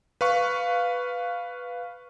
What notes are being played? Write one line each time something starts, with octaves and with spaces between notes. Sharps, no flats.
B4 F5 C#6